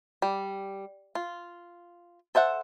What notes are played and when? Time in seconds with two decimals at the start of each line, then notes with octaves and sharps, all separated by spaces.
0.22 G3
1.15 F4
2.35 A4 C5 E5 F#5